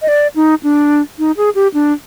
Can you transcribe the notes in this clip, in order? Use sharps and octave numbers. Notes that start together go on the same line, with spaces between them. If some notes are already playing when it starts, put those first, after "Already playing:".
D#5
D5
D#4
D4
D#4
G#4
G4
D4